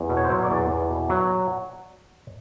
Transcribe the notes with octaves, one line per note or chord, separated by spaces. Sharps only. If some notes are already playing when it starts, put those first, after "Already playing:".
Already playing: E2
B2
C#5
C5
F#3 C#5
D5
E2
E2
B2
F#3